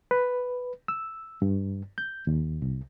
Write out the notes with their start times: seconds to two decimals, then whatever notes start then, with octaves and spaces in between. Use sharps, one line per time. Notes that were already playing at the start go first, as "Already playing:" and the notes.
0.11 B4
0.88 E6
1.42 G2
1.98 G6
2.27 D#2
2.62 C2